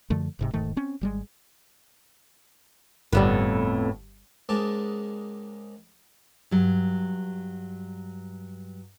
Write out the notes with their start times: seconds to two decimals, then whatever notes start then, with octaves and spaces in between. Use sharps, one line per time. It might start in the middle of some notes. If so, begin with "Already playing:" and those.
0.10 F#2 D3 F3 A3
0.39 E1 G#2 C3
0.53 E1 G#2 D#3 A3
0.77 C4 C#4
1.01 G#1 G3 G#3
3.13 G1 F2 A2 G3 B3
4.49 C#2 G#2 G#3 A#3 A5 D6
6.51 G2 F#3